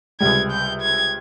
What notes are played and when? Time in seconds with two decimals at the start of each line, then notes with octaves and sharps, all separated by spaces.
0.20 C#2 C3 G3 G#6
0.51 G6
0.82 G#6